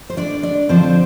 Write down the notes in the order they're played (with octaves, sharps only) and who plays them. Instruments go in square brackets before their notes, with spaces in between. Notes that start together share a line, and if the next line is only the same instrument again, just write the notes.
[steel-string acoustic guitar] C5
D4 D5
D4 D5
F2 D3 F3 C4 C5